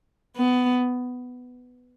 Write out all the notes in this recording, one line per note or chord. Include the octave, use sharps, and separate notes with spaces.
B3